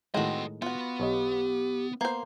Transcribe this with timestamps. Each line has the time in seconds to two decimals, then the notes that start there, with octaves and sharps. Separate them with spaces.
0.14 A2 D#3 G#3 C4 F#4 A4 D#5
0.62 B3 F4 F#4
1.00 B1 G4 C#5 D#5
2.01 A#3 B3 C5